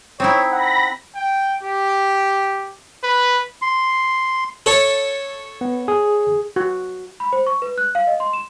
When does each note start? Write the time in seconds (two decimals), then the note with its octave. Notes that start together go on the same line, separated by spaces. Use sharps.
0.20 C4 D#4 E4 C#5
0.52 F#5 B5 A#6
1.15 G5
1.63 G4
3.04 B4
3.62 C6
4.66 A4 C#5
5.61 B3
5.88 G#4
6.56 F#4
7.20 B5
7.33 C5
7.47 C#6
7.62 B4
7.78 F#6
7.95 F5
8.07 D#5
8.20 C6
8.33 E7